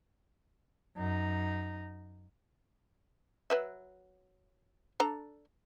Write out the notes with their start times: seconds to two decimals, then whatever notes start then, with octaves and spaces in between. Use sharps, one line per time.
0.97 F#2 D#4
3.50 F#3 B4 E5
5.00 D4 A4 A#5